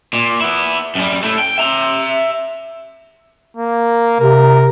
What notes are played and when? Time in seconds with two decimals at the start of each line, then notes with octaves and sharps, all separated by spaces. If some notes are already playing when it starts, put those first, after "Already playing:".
0.13 A#2
0.41 B3 E4
0.95 F#2 G3
1.23 A3 E4
1.39 G5
1.58 E5 A#5
3.57 A#3
4.20 C3 A#4